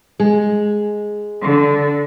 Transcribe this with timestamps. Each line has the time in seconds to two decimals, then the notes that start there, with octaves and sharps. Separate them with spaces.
0.20 G#3
1.40 D3